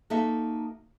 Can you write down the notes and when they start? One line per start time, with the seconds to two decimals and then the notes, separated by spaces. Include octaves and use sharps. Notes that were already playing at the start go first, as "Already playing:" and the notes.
0.10 A#3 D#4 F#4 A4 E5